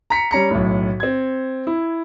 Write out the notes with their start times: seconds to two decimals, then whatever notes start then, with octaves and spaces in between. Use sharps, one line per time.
0.10 A#5 B6 C#7
0.31 G3 C#4 A#5 C#7
0.51 B1 A2
1.00 C4 G#6
1.67 E4